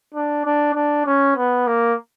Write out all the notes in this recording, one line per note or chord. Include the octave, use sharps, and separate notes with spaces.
D4
D4
D4
C#4
B3
A#3